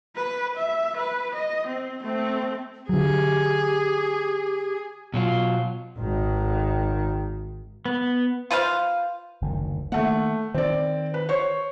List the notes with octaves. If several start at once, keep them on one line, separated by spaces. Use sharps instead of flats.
B4
E5
B4
D#5
C4
A3 C4
D3 F#3 G4 G#4
B2 F#3 F4
G#1 D#3
B3
F4 B4 C5 F5
F#1 D2 D#3
D#3 A3 A#3 F#5
D#3 C4 D5
B4
C5 C#5 C#6